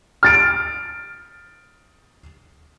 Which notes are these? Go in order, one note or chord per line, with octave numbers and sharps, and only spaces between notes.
F6 A6 D7